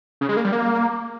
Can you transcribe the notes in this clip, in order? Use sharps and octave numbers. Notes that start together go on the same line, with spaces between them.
C#3
G#3
A#3
G3
A#3